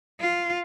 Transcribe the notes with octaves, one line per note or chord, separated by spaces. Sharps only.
F4